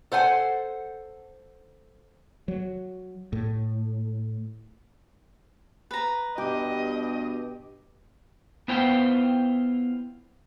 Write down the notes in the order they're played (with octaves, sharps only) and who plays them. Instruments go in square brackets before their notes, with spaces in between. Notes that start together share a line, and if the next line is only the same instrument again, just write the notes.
[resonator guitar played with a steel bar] A4 C5 F#5 G#5
[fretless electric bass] F#3
A2
[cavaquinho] B4 A#5
[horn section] G2 B2 [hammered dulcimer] G4 [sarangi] D#5
[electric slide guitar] B3 E4 F4 C5 G5